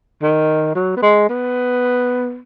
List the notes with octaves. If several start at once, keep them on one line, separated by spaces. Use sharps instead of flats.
D#3
F#3
B3
G#3
B3